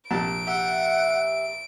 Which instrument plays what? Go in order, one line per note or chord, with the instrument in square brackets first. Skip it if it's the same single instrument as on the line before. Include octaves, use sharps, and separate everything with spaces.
[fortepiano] A#1 C3 A5 [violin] D7
[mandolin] G4 E5 [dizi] F#5